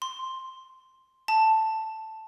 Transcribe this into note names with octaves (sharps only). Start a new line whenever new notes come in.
C6
A5